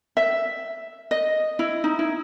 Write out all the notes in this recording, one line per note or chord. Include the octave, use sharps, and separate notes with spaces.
E5
D#5
E4
D#4
E4